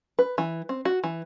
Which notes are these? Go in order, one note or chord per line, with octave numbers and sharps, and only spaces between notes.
B4
E3
C4
F#4
E3